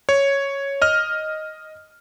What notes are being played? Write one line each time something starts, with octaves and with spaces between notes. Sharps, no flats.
C#5
D#5 F6